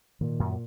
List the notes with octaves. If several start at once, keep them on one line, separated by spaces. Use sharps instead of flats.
A#2 D#3
F#2